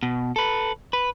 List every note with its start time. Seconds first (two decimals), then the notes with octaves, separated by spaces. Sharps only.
0.03 B2
0.36 A4 B4
0.93 B4